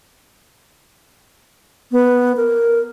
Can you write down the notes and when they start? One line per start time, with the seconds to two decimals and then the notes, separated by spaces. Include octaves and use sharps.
1.92 B3
2.37 A#4